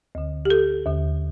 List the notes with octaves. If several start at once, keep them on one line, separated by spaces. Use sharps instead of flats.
D2 D3
G4
A4
D#2 D3